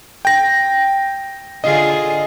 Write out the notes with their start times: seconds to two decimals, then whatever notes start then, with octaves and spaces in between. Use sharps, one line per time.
0.25 G5 A#6
1.64 D3 F4 G#4 D#5